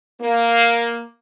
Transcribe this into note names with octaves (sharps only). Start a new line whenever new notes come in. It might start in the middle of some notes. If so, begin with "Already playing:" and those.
A#3